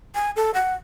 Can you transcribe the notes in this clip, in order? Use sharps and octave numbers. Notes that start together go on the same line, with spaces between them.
G#5
A4
F#5